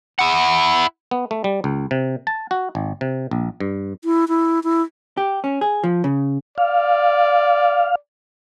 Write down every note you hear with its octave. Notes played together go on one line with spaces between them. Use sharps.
E4 F#5
B3
A3
G3
C#2
C3
A5
F#4
G#1
C3
A#1
G2
E4
E4
E4
G4
C#4
G#4
F3
C#3
D5 F5